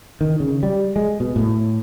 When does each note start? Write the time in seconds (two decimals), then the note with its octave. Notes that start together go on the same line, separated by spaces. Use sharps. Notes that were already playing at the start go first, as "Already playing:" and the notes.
0.21 D#3
0.40 C#3
0.63 G3
0.96 G#3
1.20 B2
1.36 A2